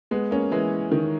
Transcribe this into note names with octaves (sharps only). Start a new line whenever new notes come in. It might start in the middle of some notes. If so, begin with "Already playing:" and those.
G#3 B3
A#3 C#4
E3 G#3
D#3